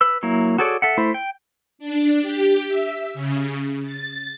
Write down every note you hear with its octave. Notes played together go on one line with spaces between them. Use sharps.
B4 E6
F#3 A#3 E4
F#4 G#4 A4 C#5 D5
A4 E5 F#5
A3 E4 C5
G5
D4
G4
E5
C#3
A6